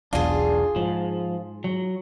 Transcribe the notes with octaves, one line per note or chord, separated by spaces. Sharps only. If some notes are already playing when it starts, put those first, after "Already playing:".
E1 B1 E2 D4 F4 G#4
G#2 F3
F#3